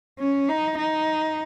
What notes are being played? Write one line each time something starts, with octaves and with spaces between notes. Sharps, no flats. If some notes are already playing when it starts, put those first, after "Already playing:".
C#4
D#4
D#4